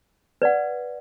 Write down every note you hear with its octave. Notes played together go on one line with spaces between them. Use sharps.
B4 D5 F#5